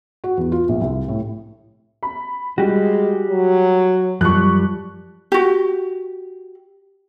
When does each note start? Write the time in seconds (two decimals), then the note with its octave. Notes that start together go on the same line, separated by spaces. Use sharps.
0.24 F#4
0.37 E2
0.52 F4
0.69 A#1
0.81 C2
1.08 A2
2.03 B5
2.58 G3 G#3 F#4 G4
3.29 F#3
4.21 F#2 F3 G3 C#6 F#6
5.32 F#4 G4